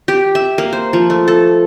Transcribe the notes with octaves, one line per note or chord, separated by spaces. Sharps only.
G4
E5
A#3
C5
F3
A3
A4